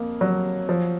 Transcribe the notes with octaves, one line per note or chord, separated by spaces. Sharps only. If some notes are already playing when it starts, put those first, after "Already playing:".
Already playing: F2 A#3
F#3
F3